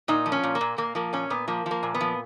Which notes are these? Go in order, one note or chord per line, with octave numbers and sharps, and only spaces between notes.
A#2 D#4
F3
C#4
A#2
A#3
A#2
A#2 A#3
F3 A#3
A#2 C#4
A#2 B3
F3 A#3
F3
A#3
A#2
B3
F3